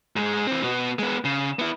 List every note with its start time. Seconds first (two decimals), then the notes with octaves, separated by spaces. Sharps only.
0.16 G#2 G#3
0.47 E3 C4
0.63 B2 B3
0.99 G#3 B3
1.24 C#3
1.59 B3 E4